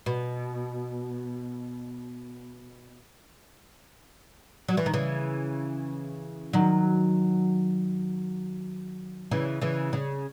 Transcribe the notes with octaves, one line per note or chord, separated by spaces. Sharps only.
B2
F#3
E3
D#3
C#3 E3
D#3 F#3
C#3 E3
C#3 E3
C#3